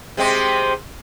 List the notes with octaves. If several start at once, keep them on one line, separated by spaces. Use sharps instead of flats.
C3 G#3 C4